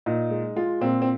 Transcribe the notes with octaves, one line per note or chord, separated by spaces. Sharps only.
A#2 D#4
G#3
G#3 F4
A#2 C4
C4